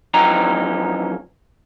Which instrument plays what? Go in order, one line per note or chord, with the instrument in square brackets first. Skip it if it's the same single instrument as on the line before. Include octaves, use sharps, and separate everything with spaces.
[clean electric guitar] F#2 E3 F3 D#4 G4 A#5